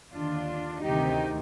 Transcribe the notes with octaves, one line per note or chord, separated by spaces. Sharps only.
D#2 D3 D4 F4
D2 C3 D#3 D#4 G4